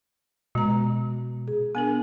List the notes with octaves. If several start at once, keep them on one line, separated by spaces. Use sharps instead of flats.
B2 G#3 A#5
G#4
B3 D4 A#4 G#5